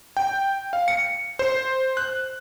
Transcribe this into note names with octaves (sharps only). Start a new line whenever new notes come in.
G5
F5
C#7
C5
F#6